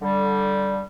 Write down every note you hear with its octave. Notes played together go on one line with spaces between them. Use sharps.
D3 G3